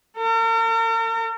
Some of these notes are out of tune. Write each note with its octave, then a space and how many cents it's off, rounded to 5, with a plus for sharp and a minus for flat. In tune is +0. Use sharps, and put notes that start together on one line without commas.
A#4 -45